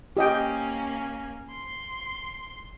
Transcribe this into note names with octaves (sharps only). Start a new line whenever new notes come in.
A#3 C#4 G4 D#5 G5
C6